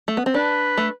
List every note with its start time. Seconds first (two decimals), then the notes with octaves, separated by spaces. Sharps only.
0.08 A3
0.17 B3
0.26 C4
0.34 D4 B4
0.77 A3